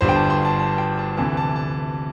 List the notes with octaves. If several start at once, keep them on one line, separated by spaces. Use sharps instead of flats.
G1 G2 G3 C5
G5
A5
C6
A5
A5
G5
A5
D2 C3 E3 A5
A5
A5